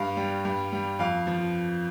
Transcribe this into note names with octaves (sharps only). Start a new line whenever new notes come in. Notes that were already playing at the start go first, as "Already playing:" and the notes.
Already playing: G2 F5
G3
G2
G3
F2 F5
F3